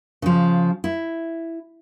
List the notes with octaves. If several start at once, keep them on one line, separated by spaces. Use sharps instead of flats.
C#3 F3
E4